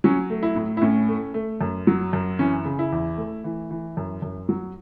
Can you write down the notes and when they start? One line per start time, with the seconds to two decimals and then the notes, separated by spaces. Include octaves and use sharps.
0.04 F#3 C#4
0.30 A3
0.43 E4
0.56 A2
0.77 E4
0.81 A2 C#4
1.08 A3
1.34 A3
1.61 F#2
1.87 F#3
2.13 F#2
2.39 E3 C#4
2.65 C#3
2.79 E4
2.92 E2
3.17 A3
3.44 E3
3.71 E3
3.97 F#2
4.22 F#2
4.49 F#3